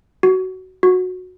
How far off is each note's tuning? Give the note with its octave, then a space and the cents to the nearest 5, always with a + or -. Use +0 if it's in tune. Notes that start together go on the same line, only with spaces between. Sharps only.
F#4 +15
F#4 -15